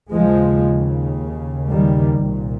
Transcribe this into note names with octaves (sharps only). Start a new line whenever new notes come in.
D#2 C#3 F3 G#3
D#3 G3
C2 A#2